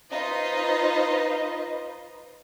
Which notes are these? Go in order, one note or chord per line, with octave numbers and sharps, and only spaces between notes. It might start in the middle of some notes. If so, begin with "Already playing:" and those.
D#4 F4 B4 C5 D#5